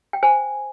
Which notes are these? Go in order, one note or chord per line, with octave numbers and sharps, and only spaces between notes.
G5
C5 G#5